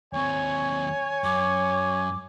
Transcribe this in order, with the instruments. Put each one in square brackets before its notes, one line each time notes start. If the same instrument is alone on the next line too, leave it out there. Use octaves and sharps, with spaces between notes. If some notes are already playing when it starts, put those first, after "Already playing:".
[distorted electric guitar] D#2 C4 [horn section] C#5 [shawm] G#5
[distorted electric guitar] F#2 [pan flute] D6